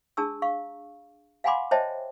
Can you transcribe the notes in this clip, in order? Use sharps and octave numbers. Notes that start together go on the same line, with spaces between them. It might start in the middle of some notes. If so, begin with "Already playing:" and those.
D4 G#4 A5 C#6 E6
F5 C#6
F5 F#5 G#5 B5 C6 D6
C5 C#5 D#5 E5 G5 A5